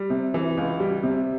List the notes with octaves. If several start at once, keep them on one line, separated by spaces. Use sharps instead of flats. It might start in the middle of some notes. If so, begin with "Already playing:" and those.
Already playing: G3
C3
E3
C#2
G3
C3